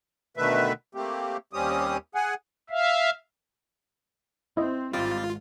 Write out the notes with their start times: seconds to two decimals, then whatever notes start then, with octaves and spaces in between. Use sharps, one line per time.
0.37 B2 D3 D#3 A3 B4 E5
0.95 A3 A#3 C4 G4
1.53 D#2 G3 C4 C#4 G4 D#6
2.15 G#4 F#5 G#5
2.70 E5 F5
4.57 C4 E4 D#5
4.93 G#1 G#2 G3 C4 F4